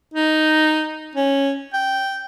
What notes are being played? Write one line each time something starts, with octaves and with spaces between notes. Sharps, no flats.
D#4
C#4
G5